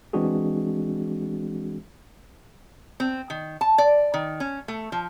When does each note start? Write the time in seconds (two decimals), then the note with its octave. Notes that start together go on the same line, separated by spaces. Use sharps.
0.13 E3 G#3 C4 D4 F#4 G#4
3.00 C4
3.30 D#3
3.61 A5
3.78 D5
4.14 D#3
4.40 C#4
4.68 A3
4.92 F3